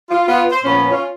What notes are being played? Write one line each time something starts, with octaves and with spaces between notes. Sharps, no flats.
F4
B3 F4
C5
A#2 F3 B3 C#4
C#4 F4